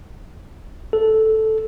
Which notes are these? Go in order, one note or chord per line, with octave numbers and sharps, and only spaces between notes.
A4